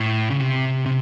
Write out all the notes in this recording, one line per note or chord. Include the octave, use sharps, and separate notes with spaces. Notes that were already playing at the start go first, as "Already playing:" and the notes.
Already playing: A2
C#3
C3
C3